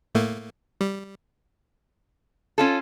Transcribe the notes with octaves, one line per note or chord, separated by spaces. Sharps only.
A2 A3 A#3
G3
C#4 F4 A4